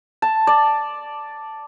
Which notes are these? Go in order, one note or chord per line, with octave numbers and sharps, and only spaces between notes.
A5
D5